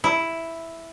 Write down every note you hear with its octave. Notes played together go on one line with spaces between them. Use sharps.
E4